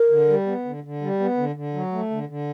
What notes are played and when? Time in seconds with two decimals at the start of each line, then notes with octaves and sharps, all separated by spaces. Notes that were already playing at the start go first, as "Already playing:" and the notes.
Already playing: A#4
0.10 D3
0.29 G3
0.47 B3
0.65 D3
0.84 D3
1.02 G3
1.20 B3
1.37 D3
1.55 D3
1.74 F#3
1.92 A3
2.11 D3
2.29 D3